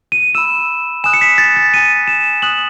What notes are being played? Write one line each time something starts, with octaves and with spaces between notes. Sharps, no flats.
D#7
B5 E6 E7
G#5 D#6 F#6 E7
C#7
B6
A6
A6
G#5 D#6 F#6 D#7
E7
G#5 D#6 F#6 F#7